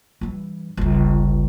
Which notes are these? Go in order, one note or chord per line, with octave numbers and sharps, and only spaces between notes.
G2 E3
G1 C#2